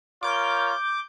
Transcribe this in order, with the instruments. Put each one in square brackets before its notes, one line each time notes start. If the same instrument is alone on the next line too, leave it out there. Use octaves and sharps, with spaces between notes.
[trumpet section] F4 A#4 C#5 [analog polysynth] D6 G6